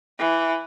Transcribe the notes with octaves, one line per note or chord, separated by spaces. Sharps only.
E3